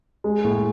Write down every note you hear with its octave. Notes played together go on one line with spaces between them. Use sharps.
G#3
A2